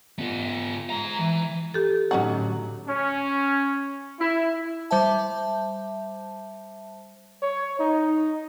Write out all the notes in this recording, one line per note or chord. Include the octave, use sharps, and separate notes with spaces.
B3 F4
G#3 A#5
E3
G4 A4
A2 D3 F#3 C#4 D#4 F#4
C#4
E4
G3 C5 E5 A5
C#5
D#4